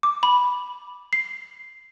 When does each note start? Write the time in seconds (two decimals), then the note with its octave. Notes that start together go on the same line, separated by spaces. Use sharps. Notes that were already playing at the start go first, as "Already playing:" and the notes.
0.03 D6
0.23 B5
1.13 C7